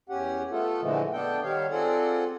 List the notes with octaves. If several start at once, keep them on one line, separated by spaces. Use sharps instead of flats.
E2 C#4 G4 F#5
A3 B3 F4 A4
A#2 D3 E3 F3 G#3 A3
B3 D4 A4 G5
D#3 G3 C#5 F5
C4 F4 G#4 A4 D5 F#5